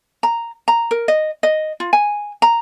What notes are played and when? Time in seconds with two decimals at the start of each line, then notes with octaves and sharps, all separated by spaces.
0.23 A#5
0.68 A#5
0.91 A#4
1.08 D#5
1.43 D#5
1.80 F4
1.93 G#5
2.42 A#5